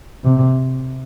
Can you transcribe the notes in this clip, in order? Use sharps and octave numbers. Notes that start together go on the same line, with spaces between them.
C3